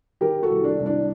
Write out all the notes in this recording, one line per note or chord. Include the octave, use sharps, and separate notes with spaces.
D#3 G4 A#4
F#4 A4
C2
D4
C2
D4